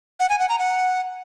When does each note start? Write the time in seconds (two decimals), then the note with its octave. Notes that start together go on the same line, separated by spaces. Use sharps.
0.20 F#5
0.30 G#5
0.39 F#5
0.49 A#5
0.59 F#5